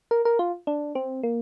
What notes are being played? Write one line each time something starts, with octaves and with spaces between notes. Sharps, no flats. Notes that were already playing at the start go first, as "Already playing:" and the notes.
A#4
A#4
F4
D4
C4
A#3